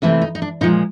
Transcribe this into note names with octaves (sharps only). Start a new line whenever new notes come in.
C3 E3 A3 C4 E4
D#4
D#4
D4
A#2 F3 G#3 D#4